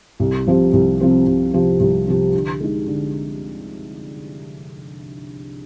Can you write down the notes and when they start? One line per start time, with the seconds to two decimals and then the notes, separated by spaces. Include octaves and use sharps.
0.20 C2
0.46 C3 F3 C4 G4
0.73 C2
1.00 C3 F3 C4 G4
1.27 C2
1.53 C3 F3 C4 G4
1.80 C2
2.07 C3 F3 C4 G4
2.34 D3
2.61 G#3 D#4
2.87 D3